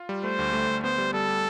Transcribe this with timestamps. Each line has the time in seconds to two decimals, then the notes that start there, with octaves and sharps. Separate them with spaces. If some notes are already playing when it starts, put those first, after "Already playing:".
Already playing: F4
0.09 G3
0.24 A3 C5
0.39 D2
0.53 A3
0.68 D2
0.84 B3 C5
0.98 G3
1.14 G3 A4
1.28 G3